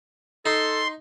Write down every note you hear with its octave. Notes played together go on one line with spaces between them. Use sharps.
D#4 A4 C6